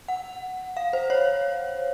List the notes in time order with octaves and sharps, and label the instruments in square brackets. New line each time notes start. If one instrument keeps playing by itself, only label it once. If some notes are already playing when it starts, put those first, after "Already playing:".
[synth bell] F#5
F5
C5
C#5